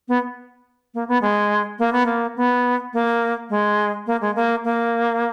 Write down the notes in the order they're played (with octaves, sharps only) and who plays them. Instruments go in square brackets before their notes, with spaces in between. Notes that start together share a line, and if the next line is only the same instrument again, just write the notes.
[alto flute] B3
A#3
B3
G#3
A#3
B3
A#3
B3
A#3
G#3
A#3
G#3
A#3
A#3